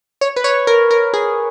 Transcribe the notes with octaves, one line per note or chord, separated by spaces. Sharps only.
C#5
B4
C#5
A#4
A#4
G#4